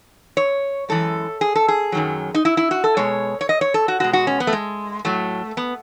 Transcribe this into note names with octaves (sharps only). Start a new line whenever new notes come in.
C#5
F#2 E3 G#3 A4
G#4
A4
G#4
F#2 D#3 F#3
D#4
E4
E4
F#4
A4
B2 G#3 C#5
C#5
D#5
C#5
A4
F#4
B2 G#3 F#4
F#4
C#4
B3
A3
G#3
A2 F#3 A3
B3